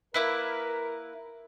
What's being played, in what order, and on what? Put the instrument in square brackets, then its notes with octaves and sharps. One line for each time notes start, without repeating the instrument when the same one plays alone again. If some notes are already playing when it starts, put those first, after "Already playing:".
[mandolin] A#3 E4 B4 [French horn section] A#4